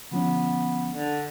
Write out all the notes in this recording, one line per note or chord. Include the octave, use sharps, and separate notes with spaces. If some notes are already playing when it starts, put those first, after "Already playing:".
D3 F3 B3 C#4
D3